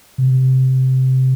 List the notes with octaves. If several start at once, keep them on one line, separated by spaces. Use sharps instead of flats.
C3